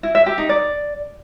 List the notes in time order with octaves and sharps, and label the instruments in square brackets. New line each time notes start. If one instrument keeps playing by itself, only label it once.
[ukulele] E4
E5
G4
D#4
D5